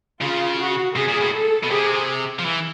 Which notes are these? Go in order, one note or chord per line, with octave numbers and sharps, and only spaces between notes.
C#3 F4
F#4
C3 G#4
A#2
A2
A4
B2
C3 G#4
F3
E3